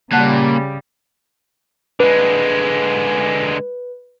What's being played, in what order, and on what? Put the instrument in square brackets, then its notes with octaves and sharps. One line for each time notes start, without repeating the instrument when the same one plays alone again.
[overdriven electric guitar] A#2 [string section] C#3 G3 [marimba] F#5 A5 F#6
[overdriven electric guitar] D3 G#3 [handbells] B4